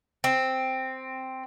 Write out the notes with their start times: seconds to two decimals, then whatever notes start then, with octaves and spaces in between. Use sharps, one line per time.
0.24 C4